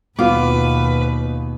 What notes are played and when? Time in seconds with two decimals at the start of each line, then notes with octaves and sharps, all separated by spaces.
0.19 D#2 B2 B3 F4 B4 F5 D6